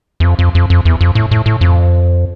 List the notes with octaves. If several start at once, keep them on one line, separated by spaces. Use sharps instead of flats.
E2
F2
F2
F2
F2
E2
F2
A2
A2
A2
F2